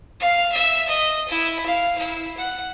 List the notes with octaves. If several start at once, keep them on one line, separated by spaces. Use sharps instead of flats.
F5
E5
D#5
E4
F5
E4
F#5